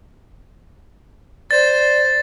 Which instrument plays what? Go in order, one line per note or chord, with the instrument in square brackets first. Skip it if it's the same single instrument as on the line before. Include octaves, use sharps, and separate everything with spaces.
[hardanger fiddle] C5 [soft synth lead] D5 [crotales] A6